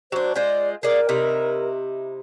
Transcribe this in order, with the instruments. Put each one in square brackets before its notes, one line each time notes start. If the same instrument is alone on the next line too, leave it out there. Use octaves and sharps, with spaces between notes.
[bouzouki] F#3 D4 [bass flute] C5
[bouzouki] G#3 F4 C5 [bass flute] D5
[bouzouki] G#4 D5 [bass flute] A#4
[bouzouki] C3 D#4 E4